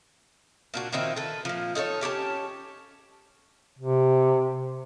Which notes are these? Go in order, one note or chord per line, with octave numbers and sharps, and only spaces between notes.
A#2 D4 F#4
A#2 D#3 C4 E4
A4 B4
A#2 F3
D#4 A4 B4 C#5
C#4 G4 C#5 A5
C3